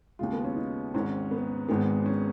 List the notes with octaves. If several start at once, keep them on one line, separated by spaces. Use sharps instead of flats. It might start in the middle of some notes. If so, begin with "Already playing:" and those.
D#2 C#3 G#3 F4
B3
C#4
D#4
G#1 G#2 D#3 C#4
B3
G#1 G#2 D#3 G#3 B3
C#4